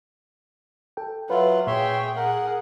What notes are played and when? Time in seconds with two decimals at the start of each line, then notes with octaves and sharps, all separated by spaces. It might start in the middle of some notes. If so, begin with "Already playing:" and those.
0.97 A4 G5
1.30 F#3 F4 B4 E5 F#5
1.67 A#2 G#4 C#5 E5 G5 C6
2.16 G#4 A#4 F#5